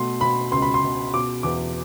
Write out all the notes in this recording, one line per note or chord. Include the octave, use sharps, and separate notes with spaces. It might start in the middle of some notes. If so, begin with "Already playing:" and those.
Already playing: B2 A3 C6
B2 B5
C#2 C6
B5
C6
B2
B2 D6
E2 D6